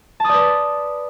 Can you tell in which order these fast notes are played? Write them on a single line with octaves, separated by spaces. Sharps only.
A5 D#6 D5 B4